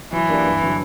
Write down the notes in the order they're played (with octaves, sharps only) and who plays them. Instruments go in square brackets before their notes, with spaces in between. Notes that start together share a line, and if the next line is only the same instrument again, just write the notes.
[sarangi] E3 [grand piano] F#3
[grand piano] A#3 D4 G4 B4
G2
D3 F#3